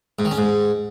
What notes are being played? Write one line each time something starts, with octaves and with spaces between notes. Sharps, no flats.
G#2
D#3
C#4
G#2